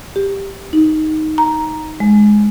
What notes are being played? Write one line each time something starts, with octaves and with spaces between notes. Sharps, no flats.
G4
D#4
A#5
G#3